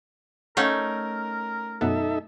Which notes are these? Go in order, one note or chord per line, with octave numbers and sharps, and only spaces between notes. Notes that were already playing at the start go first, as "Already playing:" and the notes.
A3 C#4 D#4 A#4 F5 F#5
F#2 B2 B3 D#4 A4 E5